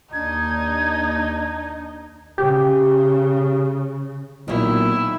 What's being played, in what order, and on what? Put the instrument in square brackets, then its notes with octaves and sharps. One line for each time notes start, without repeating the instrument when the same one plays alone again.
[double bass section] D#2 [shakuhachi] D4 [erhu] D#4 [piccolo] G#6
[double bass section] C#3 [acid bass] G4
[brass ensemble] B1 A#2 [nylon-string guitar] D#3 C#5 [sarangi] E4